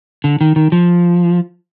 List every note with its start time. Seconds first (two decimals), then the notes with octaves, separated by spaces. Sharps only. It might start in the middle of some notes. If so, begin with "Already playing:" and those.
0.24 D3
0.41 D#3
0.56 D#3
0.72 F3